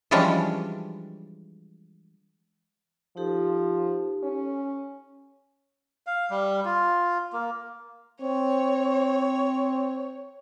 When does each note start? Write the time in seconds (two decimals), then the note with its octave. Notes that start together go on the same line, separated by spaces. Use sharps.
0.11 E3 F3 G3 G#3 C#4 D4
3.17 F3 D#4 G4 A4
4.23 C#4
6.07 F5
6.30 G3
6.65 F4
7.33 A#3
8.21 C4 C#5